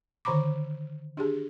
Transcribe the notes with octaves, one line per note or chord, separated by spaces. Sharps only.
D3 D#3 C5 A#5 B5 D6
D4 G4 G#4